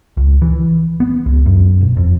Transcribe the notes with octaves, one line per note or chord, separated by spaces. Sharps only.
C#2
E3
B3
C#2
F#2
E1
F2